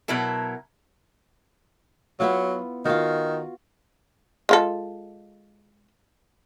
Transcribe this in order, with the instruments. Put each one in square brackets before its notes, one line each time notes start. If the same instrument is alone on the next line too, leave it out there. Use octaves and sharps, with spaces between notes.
[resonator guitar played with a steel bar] B2 F#3 E4 A#4 A5
[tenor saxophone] F#3 [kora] B3 E4 F4
[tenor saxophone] D#3 [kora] F4 F#4
[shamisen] G#3 F4 A4